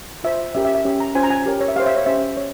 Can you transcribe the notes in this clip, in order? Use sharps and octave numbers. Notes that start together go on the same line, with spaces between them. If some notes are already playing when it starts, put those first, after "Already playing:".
F4 C5 E5
C#4 G4 A#4 E5
E5
E5
C#4 G4 C#5
A#5
C#4 F4 C5 G#5
A#5
G#5
G4 A#4 C#5
C#5
E5
G4 C5 C#5 F5
E5
C#5
C#4 G4 C5 E5
C#5